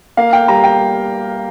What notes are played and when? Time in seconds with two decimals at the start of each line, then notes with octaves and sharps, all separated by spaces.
0.17 A#3 F5
0.33 G5
0.48 G3 A#5
0.64 G5